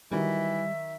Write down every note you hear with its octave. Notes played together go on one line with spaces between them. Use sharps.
D#3 E3 F#3 G3 E5